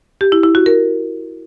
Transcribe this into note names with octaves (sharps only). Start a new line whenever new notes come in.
G4
E4
E4
F#4
A#4